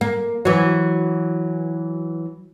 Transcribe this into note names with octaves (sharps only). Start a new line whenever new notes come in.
A#3
E3 F#3